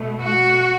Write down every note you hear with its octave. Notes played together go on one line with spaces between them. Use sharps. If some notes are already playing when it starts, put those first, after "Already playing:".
Already playing: B2 A3
F#4